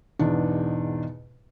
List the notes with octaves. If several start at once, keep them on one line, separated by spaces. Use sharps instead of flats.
E2 G#2 B2 D4